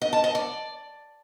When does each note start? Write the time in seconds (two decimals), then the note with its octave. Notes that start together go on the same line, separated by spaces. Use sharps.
0.02 D#5
0.13 A5
0.24 D#5
0.35 D5